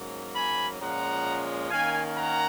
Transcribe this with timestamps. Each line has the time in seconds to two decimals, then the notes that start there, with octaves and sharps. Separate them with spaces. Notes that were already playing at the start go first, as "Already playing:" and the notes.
Already playing: G#2 F#3 A#3 C#4
0.35 G#5 B5
0.80 A#2 F3 G#3 C#4 F#5 A#5
1.70 D#3 A#3 C#4 F5 G#5
2.16 F#5 A#5